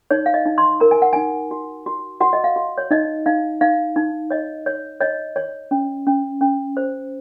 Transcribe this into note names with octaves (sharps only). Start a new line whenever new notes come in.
D#4 C#5
F5
D#5
D#4
C6
A#4 A#5
G#5
F#5
D#4 G#5
F#4
F#4
F#4 F#5
D#5
F5
F#4
C#5
D#4 D#5
D#4 F5
D#4 F5
D#4
C#5 D#5
C#5
C#5 D#5
C#5
C#4
C#4
C#4
C5